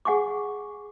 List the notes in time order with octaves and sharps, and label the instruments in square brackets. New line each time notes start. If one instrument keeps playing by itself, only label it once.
[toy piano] G#4 F#5 G#5 C#6 D6